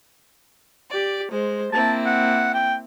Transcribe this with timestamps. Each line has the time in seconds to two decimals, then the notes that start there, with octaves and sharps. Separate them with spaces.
0.90 G4 D5
1.31 G#3 C5
1.72 A#3 C4 E4 A5
2.06 F#5
2.54 G5